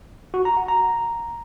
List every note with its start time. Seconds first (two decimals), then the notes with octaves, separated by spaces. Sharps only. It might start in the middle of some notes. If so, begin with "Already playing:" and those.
0.34 F#4
0.45 A#5
0.57 F#5
0.68 A#5